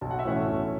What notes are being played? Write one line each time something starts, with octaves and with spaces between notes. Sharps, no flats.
B1 A5
F#5
E5
A2 E3 C#4 C#5 F#5
B1